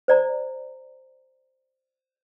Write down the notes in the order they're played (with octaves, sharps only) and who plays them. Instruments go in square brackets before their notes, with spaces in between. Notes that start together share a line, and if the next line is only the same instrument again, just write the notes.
[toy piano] C5 D5 A#5